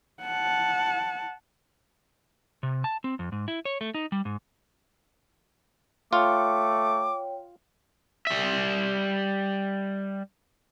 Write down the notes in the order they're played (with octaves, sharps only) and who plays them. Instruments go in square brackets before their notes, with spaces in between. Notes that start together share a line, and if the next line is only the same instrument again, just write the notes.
[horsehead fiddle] F#5 A5
[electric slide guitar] C3
A5
C4
F2
G#2
E4
C#5
A3
D#4
G3
G#2
[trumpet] A3 [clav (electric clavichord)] F4 [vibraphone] C#5 G5 [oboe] D6
[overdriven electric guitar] G3 E5